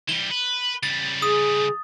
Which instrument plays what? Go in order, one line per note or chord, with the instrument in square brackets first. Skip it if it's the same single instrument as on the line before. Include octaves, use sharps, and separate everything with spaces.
[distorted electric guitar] E3 G3 [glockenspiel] G7
[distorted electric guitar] B4
[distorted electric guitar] C#3 G3 [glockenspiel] A6
[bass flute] G#4 [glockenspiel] D#6